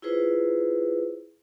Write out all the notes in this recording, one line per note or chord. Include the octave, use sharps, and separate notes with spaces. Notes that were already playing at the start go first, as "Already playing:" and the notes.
E4 F4 G#4 B4 C5